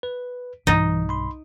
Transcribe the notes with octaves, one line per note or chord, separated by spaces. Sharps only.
B4
B1 G2 E3 D#4
B5 C6